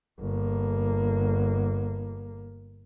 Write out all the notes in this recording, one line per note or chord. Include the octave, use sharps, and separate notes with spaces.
G1 A#3